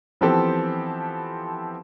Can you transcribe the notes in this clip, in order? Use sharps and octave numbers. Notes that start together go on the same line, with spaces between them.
E3 F3 B3 C4 G4 A4